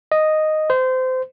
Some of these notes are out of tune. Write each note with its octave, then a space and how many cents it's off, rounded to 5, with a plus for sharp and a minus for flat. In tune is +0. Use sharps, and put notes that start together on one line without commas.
D#5 -5
C5 -25